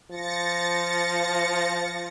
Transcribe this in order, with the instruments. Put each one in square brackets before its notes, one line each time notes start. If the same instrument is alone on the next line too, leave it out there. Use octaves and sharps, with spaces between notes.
[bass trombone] F3 [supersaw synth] A6 A#6 C#7